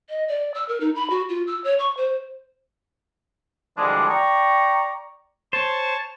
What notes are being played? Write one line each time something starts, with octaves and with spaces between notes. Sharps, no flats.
D#5
D5
E6
A#4
D#4
B5
F#4
F4
E6
C#5
C#6
C5
D3 E3 F3 G3 G#3 D4
D5 G5 A#5 C#6
C5 C#5 A5